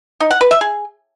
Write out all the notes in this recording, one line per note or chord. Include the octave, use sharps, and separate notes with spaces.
D#4
F#5
B4
E5
G#4